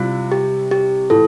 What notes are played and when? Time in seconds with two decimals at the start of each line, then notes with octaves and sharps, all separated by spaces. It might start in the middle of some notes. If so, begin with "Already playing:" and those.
Already playing: C3 G3 E4 F4
0.32 G4
0.71 G4
1.10 A2 E3 A4